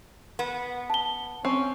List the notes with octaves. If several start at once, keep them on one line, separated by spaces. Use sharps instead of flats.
B3
A5 G7
C4 C#4